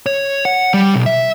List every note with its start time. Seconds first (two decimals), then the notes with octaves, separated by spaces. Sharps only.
0.06 C#5
0.45 F#5
0.74 G3
0.94 B1
1.06 E5